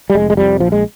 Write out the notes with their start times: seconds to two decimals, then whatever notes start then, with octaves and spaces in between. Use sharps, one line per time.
0.10 G3
0.15 F1 G#3
0.30 G#3
0.37 F2 C3 G3
0.60 A#1 F3
0.72 G#3